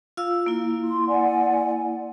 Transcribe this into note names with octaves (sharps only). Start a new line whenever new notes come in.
F4 F5 E6
A#3 E4
C6
D5 F#5 G#5